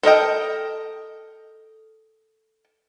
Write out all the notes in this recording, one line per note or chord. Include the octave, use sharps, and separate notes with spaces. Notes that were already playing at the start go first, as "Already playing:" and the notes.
A4 A#4 D#5 G5